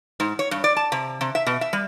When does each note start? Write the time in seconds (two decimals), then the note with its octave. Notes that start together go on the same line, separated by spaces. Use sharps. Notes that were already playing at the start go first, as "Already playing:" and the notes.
0.20 G#2
0.39 C#5
0.51 G2
0.64 D5
0.77 A5
0.92 C3
1.21 C3
1.35 E5
1.47 B2
1.61 E5
1.73 G3